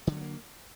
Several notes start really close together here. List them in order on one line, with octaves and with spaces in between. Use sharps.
D3 F#3 A3 A#3